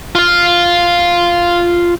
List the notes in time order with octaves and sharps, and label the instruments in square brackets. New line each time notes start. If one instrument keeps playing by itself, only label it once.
[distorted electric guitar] F4 F5